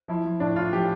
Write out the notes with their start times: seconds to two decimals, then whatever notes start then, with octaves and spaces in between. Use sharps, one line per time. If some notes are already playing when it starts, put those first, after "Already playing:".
0.08 F3 E4
0.25 F3
0.40 A2 D4
0.56 A2 F4
0.73 F3 G4